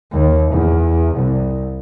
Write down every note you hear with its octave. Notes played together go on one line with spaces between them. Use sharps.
D#2
E2
C2